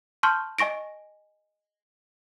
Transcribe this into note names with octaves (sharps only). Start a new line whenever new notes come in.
A5 C6 C#6 F6 G6
D#5 G#5 C#6 A#6 D7